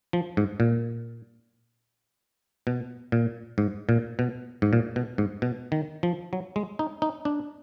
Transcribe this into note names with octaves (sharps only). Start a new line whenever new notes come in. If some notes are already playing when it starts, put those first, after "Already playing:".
F3
G#2
A#2
B2
A#2
G#2
A#2
B2
G#2
A#2
B2
G#2
B2
D#3
F3
F#3
G#3
D#4
D#4
D4